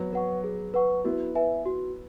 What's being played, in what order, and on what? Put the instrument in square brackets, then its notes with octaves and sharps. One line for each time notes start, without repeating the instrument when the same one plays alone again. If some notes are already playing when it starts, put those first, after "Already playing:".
Already playing: [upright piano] F#3 B3
[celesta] B4 F#5 C#6
G#4
B4 F#5 C#6
[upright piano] B3 E4 [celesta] F#4
[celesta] B4 E5 G#5
F#4